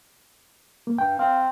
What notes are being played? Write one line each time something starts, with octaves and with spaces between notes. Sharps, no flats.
A#3
G2 G5
C4 F5